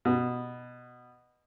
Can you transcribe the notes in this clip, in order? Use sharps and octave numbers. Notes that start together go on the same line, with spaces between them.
B2